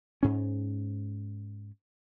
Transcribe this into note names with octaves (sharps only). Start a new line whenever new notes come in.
G#2 C#4